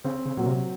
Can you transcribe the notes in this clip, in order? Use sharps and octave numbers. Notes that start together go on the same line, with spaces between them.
C#3 C4
C#3
A#2 F#3
C3